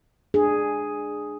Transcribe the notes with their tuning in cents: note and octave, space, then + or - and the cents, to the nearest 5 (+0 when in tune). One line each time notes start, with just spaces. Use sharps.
D4 +20 G#4 +0